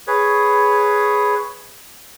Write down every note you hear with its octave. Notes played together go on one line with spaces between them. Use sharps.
G#4 B4 C#5